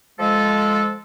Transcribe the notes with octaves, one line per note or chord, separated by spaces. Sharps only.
F3 G#3 A4